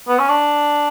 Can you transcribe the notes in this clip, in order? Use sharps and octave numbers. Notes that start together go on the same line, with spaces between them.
B3
C#4
D4